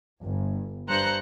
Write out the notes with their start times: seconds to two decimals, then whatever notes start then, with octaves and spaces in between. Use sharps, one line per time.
0.21 G1
0.88 G2 C5 A#5 F#6 C#7